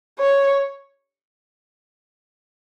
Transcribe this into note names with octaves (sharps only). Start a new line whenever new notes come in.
C#5